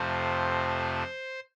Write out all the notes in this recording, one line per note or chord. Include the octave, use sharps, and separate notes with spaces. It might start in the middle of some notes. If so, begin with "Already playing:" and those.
Already playing: F2 C3 F3 A3 C5